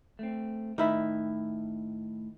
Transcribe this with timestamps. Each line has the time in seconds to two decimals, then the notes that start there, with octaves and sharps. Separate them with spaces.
0.19 A3 C4
0.78 A2 D#3 E4 E5